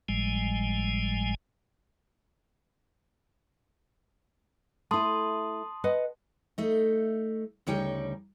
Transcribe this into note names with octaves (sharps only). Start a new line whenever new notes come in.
G#1 A2 F3 G3 G#3 G#5
A3 E4 A5 C6 D#6
B4 D#5 F#5
A3 D#4
D2 C#3 G3 D#4 C#5 G5